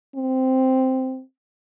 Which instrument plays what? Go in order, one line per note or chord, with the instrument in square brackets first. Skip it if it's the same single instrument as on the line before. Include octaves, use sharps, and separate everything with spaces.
[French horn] C4